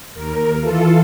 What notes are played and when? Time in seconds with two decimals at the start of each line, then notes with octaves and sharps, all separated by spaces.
0.14 D#2 A#4
0.60 E3 F4 A4